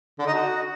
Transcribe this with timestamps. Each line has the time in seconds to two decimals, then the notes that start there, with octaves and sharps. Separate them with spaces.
0.19 D3
0.26 D#4
0.34 F#4